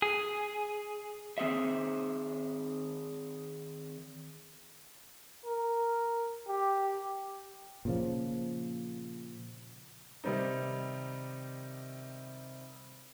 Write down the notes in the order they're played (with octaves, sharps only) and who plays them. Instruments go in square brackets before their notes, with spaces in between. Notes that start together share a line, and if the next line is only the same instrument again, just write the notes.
[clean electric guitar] G#4
[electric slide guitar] D#3 C4 G#4 E5
[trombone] A#4
G4
[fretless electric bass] A#2 C#3 F3
[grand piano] C3 D#3 G3 C4 D#4